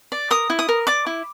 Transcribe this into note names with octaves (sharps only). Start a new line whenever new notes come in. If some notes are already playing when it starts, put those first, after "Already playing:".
D5
A#4 D#6
E4
D#6
A#4
D5 D6
E4